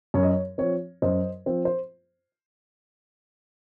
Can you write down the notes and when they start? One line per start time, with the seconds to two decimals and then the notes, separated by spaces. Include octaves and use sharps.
0.14 F#2 C#5
0.23 D#5
0.32 C#5
0.58 F3 C4 C#5
1.02 F#2 C5 D#5
1.46 F3 C4
1.65 C5